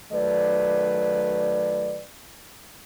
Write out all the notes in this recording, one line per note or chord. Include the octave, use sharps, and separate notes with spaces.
D#3 F#3 A3 B4 D5